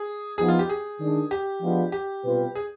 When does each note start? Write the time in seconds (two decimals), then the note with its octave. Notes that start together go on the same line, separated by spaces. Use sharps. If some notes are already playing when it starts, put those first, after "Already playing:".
Already playing: G#4
0.38 F3 B3 D#4 G#4
0.48 F4
0.59 G4
0.69 G#4
1.00 D#3 G#3 D4
1.31 G4
1.62 F3 G#3 B3 D4 F4
1.92 G4
2.24 B2 G3 C4 F4 B4
2.55 G#4